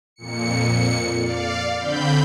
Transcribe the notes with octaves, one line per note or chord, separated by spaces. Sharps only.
F2 A#2 C#7
D5 F5
D3 C4 B5 G6